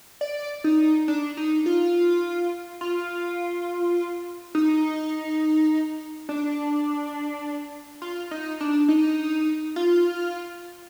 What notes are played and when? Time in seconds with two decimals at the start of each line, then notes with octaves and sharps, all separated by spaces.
0.21 D5
0.64 D#4
1.08 D4
1.37 D#4
1.66 F4
2.81 F4
4.55 D#4
6.29 D4
8.02 F4
8.31 D#4
8.60 D4
8.88 D#4
9.76 F4